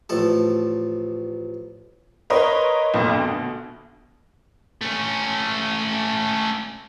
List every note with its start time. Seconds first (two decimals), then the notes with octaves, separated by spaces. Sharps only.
0.09 A1 F3 A4
2.30 A#4 B4 C#5 D#5 C6
2.94 B1 F2 A#2
3.11 D2 B2
4.81 A3 C#4